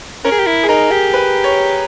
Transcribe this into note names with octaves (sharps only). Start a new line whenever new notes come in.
C#4 A#4
G#4
G4
E4
G#4
D#4 A#4
G4
B4
C#5